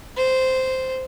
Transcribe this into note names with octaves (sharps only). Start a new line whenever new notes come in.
C5